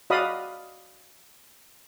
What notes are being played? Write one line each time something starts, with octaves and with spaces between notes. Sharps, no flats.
F#4 D5 D#5 F5 B5 D#6